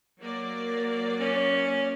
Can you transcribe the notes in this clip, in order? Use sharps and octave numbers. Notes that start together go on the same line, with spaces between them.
F#3 A#3 D5
C#4